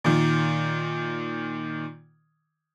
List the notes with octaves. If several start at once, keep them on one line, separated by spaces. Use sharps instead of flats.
A#2 D#3